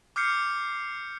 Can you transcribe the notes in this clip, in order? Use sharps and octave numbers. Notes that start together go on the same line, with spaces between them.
D6 F6 G6 C7 C#7